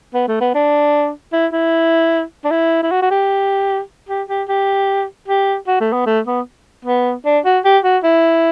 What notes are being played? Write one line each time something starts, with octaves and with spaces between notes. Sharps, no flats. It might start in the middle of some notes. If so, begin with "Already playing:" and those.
B3
A3
B3
D4
E4
E4
D4
E4
E4
F#4
F#4
G4
G4
G4
G4
G4
F#4
A3
B3
A3
B3
B3
D4
F#4
G4
F#4
E4